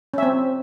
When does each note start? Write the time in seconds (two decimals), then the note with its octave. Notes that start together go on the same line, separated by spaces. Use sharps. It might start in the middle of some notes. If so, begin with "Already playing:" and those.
0.14 C#4
0.18 E5
0.23 C4